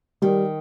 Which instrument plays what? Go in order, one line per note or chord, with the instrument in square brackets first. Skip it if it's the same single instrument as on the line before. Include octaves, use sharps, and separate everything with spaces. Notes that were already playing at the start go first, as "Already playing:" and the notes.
[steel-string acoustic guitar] D#3 [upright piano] G3